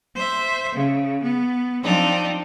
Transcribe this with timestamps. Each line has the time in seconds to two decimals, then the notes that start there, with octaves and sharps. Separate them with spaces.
0.14 C5 E5
0.74 C#3
1.22 B3
1.82 F3 C4 D4 D#4